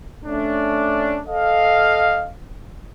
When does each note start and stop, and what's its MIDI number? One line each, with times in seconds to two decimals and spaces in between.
0.24 1.21 57
0.24 1.21 61
0.24 1.21 62
1.27 2.28 69
1.27 2.28 75
1.27 2.28 77